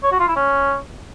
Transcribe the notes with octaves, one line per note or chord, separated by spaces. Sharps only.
C#5
F#4
F4
E4
C#4